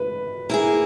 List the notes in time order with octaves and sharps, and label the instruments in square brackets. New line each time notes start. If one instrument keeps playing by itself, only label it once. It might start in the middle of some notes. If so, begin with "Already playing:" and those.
Already playing: [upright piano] B4
[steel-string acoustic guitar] A#3 E4 G#4